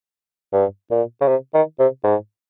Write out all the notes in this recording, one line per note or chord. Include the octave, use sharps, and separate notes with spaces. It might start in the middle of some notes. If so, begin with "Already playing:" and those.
G2
A#2
C#3
C3
D#3
C3
G#2